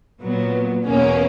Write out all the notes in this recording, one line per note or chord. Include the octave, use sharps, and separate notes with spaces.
A#2 F#3 B3
E2 B2 A#3 C#4